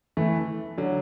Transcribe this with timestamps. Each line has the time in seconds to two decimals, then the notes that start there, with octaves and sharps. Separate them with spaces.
0.17 E3 A3
0.78 D3 F#3